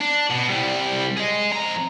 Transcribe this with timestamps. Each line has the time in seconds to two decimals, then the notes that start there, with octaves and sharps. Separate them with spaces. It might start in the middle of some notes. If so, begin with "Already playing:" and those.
0.01 D4
0.30 B2
0.48 C2 G3
1.17 G#4 D#5
1.52 F2 A#5